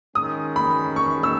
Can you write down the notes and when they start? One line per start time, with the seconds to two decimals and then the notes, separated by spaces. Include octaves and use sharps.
0.15 D#3 G#3 C#4 D#6
0.56 B5
0.96 C#6
1.23 E6